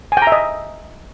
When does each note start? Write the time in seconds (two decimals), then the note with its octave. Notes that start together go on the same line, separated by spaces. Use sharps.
0.12 G#5
0.17 G5
0.22 A#5
0.27 E5
0.32 D#5